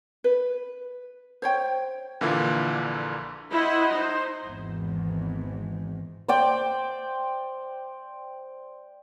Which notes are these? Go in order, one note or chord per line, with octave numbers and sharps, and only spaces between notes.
B4
C5 C#5 G5
A#1 D3 E3 A#3 E4 F4
E4 C5 D#5 F#5
D#4 C5
G#1 E2 G#2
C5 D5 G5